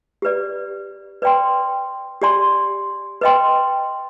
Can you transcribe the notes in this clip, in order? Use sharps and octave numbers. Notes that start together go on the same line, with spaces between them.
G4 B4 D5
B4 D5 G5 C6
G4 D5 G#5 C6
B4 D#5 G5 C6